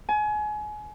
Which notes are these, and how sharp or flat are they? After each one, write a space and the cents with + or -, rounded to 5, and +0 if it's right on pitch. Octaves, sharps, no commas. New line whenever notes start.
G#5 +30